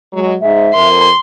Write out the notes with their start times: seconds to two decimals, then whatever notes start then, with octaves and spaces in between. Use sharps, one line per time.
0.13 F#3 G#3
0.41 G#2 E5
0.74 F2 A#4 C6